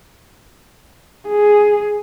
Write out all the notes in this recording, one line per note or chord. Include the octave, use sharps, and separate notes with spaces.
G#4